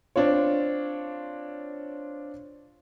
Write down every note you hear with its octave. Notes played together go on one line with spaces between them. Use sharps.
C4 D4 F4 C#5